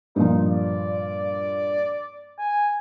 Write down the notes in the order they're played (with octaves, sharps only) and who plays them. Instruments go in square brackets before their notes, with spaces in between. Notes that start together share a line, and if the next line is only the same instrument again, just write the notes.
[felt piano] G2 A#2 F3 [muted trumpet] D#4
[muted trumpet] D5
G#5